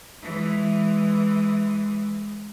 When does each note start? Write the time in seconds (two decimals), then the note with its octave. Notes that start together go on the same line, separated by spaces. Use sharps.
0.22 E3 G#3